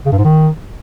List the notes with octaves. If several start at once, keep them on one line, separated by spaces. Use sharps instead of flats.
C#3
G2
G#2
D#3